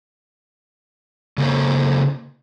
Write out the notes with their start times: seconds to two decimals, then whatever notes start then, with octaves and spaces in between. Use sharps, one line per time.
1.38 C#3 F#3 A#3 A4 C5 C#5